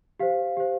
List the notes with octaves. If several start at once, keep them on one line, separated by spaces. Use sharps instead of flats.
G4 C5 F5
G4 C5